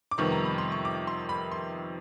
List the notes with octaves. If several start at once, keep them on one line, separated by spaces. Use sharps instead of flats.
D6
F2 C3 D#3 G3 B3 C#6
A#5
B5
C6
C#6
D6
C6
B5
C6